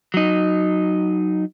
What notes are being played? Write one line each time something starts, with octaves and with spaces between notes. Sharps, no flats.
F#3 D#4